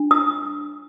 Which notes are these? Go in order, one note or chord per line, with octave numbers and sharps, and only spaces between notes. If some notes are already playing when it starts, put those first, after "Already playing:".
Already playing: D4
D#6